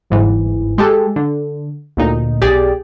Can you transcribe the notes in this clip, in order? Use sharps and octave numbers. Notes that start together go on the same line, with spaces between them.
G1 G#2 E3
G#3 G4 A4
D3
D2 A#2 D#4
B1 G4 G#4 D5